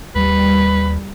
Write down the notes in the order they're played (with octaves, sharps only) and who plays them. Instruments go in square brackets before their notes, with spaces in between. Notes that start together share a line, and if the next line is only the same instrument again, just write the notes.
[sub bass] D#2 [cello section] G3 [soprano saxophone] B4